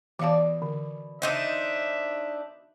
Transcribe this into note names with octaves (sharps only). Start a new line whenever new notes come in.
B2 E3 D5 F5 A5
D3
D4 D#4 C5 D#5 E5